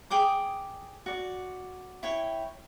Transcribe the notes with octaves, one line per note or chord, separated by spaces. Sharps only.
G#4 G5 D6 D#6
F#4 D5
E4 C#5 G5